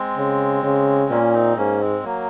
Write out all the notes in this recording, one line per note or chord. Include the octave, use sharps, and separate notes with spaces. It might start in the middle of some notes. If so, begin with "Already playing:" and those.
Already playing: G#3 C4
C#3
C#3
A#2 A#3 C#4
C4 D#4
G#2 A#3 C#4
G#3 C4
F#3 A#3